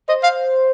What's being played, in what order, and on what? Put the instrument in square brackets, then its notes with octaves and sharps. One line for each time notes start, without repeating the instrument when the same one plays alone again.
[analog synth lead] C5 [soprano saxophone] D#5
[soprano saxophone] F5